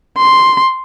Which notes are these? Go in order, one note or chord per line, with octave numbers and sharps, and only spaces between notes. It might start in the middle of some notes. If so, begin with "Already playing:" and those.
C6